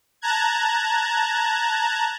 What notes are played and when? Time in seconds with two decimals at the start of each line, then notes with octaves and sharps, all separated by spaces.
0.22 A5 A#5 F#6 G#6